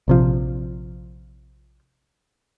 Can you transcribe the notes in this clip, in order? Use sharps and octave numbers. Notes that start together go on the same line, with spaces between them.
A#1 C3 F3